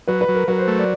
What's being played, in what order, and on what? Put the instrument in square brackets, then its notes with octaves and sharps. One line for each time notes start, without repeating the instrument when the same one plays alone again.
[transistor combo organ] F#3 [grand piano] B4
[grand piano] B4
[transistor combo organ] F#3
[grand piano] A#4
[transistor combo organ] F#3 [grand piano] B4
[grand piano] C5
[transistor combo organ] A3
[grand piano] D5